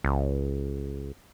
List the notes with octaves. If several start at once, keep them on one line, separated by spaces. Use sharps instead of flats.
C#2